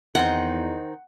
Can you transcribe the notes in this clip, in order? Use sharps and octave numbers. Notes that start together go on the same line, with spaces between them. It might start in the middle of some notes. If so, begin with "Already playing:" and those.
E2 D#3 C4 D#4 F#5